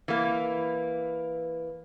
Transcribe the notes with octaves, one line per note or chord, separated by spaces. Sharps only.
E3 A#3